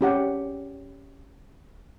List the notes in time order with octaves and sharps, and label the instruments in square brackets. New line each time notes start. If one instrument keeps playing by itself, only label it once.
[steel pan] C#4 G4 F#5